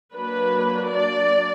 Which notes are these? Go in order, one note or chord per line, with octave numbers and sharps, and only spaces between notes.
F#3 A#3 D4 B4
D5